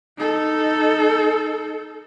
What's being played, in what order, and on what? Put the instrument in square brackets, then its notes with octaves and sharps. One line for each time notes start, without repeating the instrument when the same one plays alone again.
[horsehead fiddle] D#4 A4